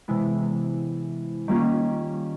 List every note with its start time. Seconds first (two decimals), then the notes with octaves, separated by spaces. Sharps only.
0.08 C3 E3 G#3 B3 E4
1.48 D#3 G3 A#3 C#4 F4